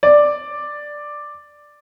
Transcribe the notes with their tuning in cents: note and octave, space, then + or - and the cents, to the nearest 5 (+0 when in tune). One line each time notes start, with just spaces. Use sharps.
D5 +5